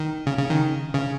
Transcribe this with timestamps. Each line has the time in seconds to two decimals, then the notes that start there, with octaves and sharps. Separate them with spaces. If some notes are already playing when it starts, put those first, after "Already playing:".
Already playing: D#3
0.26 C#3
0.38 C#3
0.50 D#3
0.94 C#3